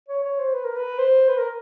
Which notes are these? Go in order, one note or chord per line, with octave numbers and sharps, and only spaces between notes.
C#5
C#5
C5
B4
A#4
B4
C5
B4
A#4